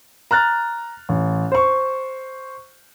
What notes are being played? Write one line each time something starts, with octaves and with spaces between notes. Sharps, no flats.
A#5 F6 F#6 A6
A1
C5 C#6